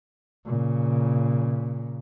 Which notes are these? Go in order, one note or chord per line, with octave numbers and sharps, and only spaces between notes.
A#2 C#3